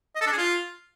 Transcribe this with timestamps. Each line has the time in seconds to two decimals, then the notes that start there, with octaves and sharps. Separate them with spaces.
0.15 D#5
0.21 A4
0.27 D4
0.32 G#4
0.38 F4